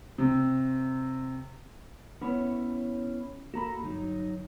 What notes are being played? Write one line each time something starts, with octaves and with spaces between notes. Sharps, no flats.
C3
B3 C#4 E4 C#5 B5
A#3 F#4 A4 A#5 B5
G1 F#3 D#4